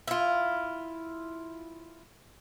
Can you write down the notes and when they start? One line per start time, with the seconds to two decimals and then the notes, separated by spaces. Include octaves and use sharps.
0.08 E4 F4